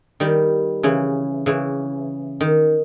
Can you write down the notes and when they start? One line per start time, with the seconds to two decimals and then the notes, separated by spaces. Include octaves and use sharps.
0.20 D#3 G3
0.83 C#3 E3
1.46 C#3 E3
2.41 D#3